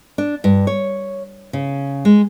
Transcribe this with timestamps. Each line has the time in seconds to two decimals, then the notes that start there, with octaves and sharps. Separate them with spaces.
0.18 D4
0.44 G2
0.67 C#5
1.53 C#3
2.05 G#3